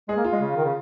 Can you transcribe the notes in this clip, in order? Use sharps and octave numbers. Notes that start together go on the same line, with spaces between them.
G#3 G#4
A#3
F4
G#3
C#3
D#3
C#3